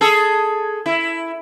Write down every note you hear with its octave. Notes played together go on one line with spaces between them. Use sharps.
G#4 A4
E4